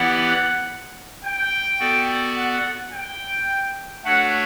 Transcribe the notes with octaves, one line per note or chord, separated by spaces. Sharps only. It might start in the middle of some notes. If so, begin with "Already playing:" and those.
Already playing: E3 B3 E4 G4 D5 F#5
G5
B3 F#4 A4 D5
F#5
G5
A3 D4 F#4 A4 C#5 F#5